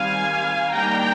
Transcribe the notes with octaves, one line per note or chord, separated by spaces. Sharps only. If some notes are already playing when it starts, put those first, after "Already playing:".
Already playing: D#3 G3 C4 F5 G#5
D#3 G3 A#3 D4 G5 A#5